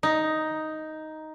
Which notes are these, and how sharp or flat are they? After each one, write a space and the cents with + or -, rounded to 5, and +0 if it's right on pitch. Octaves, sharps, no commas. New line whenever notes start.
D#4 +5